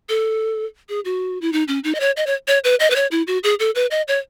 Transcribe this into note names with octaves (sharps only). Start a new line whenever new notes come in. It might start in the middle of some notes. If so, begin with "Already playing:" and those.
A4
G#4
F#4
E4
D#4
C#4
D#4
D#5
C#5
D#5
C#5
C#5
B4
D#5
B4
C#5
E4
F#4
G#4
A4
B4
D#5
C#5